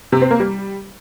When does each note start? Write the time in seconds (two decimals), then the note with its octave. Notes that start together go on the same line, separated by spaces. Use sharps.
0.12 C3
0.21 C4
0.31 A#3
0.40 G3